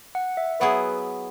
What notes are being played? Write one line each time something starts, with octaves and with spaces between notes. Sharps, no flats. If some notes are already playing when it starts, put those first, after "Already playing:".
F#5
E5
F#3 B3 E4 G#4 B4